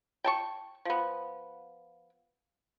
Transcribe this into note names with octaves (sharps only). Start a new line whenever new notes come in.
G5 A5 C#6
F3 B3